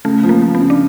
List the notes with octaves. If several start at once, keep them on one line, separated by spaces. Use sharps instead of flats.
C#3 A3
F3
A#3
F3
B3
C#3
D4